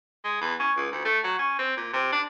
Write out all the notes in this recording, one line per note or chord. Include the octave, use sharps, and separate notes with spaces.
G#3
E2
C#4
C#2
D2
A3
F#3
C#4
C4
A#2
C3
D4